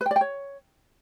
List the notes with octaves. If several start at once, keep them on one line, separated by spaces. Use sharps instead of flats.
B4
G5
D5
G5
C#5